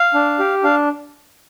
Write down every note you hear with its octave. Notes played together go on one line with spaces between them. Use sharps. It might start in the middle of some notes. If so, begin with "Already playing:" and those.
Already playing: F5
D4
G4
D4 F5